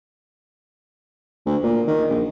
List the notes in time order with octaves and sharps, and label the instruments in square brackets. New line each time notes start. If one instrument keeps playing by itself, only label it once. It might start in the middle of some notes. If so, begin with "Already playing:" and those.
[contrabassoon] D2
A#2
D#3
A#1